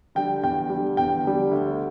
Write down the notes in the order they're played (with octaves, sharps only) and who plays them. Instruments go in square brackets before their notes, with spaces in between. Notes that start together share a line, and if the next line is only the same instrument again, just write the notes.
[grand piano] D3 G3 G5
E2 G5
D3 G3
E2 G5
D3 G3
D2